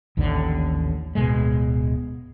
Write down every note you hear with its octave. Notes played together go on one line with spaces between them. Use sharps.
A1 D#2 A2 D3
D1 B2 G#3